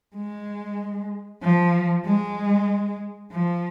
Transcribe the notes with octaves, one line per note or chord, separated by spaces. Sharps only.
G#3
F3
G#3
F3